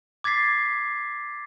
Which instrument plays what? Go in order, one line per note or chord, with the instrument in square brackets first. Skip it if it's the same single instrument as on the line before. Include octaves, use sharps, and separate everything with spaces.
[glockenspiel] D6 G#6 A6 B6 C7